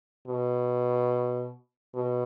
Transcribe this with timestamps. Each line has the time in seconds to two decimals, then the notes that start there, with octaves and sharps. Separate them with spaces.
0.28 B2
1.95 B2